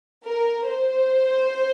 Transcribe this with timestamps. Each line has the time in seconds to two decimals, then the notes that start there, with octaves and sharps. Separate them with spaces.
0.25 A#4
0.67 C5